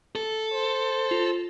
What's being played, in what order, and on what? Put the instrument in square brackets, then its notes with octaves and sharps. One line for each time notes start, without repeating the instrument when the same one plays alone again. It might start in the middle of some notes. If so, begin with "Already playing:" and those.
[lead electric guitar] A4
[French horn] C5
[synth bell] F4